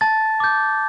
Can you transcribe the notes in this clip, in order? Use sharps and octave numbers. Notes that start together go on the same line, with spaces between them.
A5 A6
D6 G6